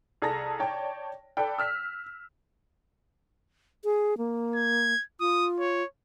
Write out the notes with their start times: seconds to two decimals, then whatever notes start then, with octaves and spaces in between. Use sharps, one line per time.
0.22 C2 G#4 A4 A5 A#5 A#6
0.59 C#5 D5 G5 A5
1.37 A4 B4 D5 G5
1.58 E6 F6 B6
3.84 G#4
4.18 A#3
4.55 G#6
5.20 F4 D#6
5.60 C#5